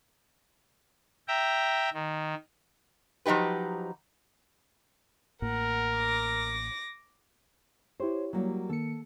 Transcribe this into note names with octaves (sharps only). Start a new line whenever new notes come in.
E5 G5 A#5
D#3
F3 F#3 D#4 G4 B4
A1 A2 A#3 A#4 F#5
D6 A#6
E4 G4 C5 C#5
F#3 G3 A#3
D#3 A#3 A4 C#7